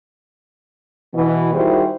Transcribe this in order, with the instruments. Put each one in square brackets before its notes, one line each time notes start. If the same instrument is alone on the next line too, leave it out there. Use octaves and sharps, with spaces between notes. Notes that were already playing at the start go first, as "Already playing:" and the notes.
[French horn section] B2 E3
D#3 G3 E4 F#4 G#4 C5